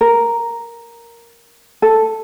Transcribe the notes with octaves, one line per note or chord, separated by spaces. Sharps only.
A#4
A4